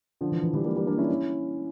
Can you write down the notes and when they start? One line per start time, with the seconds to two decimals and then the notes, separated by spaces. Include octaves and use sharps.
0.21 D3 F3
0.32 E3
0.43 E3
0.54 E3 G3
0.65 G3 A#3
0.76 G3 A#3
0.87 A#3 D4
0.98 C#4 E4
1.08 C#4 E4